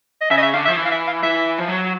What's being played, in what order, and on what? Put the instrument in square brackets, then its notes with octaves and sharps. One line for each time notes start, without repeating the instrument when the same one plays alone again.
[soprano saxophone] D#5
[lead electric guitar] C#3 [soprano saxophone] E5
[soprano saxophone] D#5
E5
[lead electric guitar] D3 [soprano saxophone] F5
[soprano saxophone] E5
[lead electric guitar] F3
E3
[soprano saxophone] F5
E5
F5
[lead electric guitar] E3 [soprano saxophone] E5
[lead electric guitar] F3
F#3